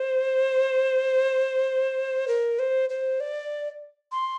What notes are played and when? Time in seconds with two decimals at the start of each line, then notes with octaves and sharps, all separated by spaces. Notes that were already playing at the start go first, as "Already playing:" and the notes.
Already playing: C5
2.28 A#4
2.59 C5
2.90 C5
3.20 D5
4.12 C6